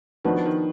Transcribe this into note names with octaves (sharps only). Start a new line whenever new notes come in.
D#3 F3 B3 D4 F#4 B4
D#3